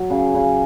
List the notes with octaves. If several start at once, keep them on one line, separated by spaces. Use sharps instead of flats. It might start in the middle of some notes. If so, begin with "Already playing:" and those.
Already playing: F#3
C#3
C#3